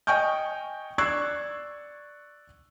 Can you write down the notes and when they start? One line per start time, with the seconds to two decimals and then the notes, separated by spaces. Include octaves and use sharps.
0.07 D#5 G5 G#5 C#6 F6 G6
0.98 D5 C#6 E6 F#6 G#6 C7